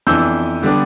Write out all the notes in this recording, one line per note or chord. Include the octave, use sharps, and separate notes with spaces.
F2 E3 B3 D4 E6 G6
D3 G3 B3 D4